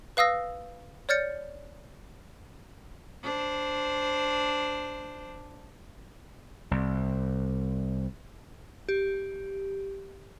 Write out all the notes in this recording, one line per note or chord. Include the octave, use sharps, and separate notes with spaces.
B4 F5 D#6 E6 A#6
C#5 D5 F6 G6 A6 C#7
D4 C5
C2
G4